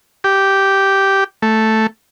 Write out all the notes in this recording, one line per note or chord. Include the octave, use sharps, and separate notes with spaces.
G4
A3